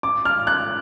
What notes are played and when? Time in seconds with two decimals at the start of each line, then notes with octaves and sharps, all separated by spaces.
0.03 D6
0.25 F6
0.47 F#6